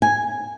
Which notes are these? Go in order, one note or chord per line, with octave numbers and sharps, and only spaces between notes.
G#5